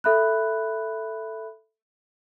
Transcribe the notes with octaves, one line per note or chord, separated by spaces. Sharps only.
A4 E5 B5 F#6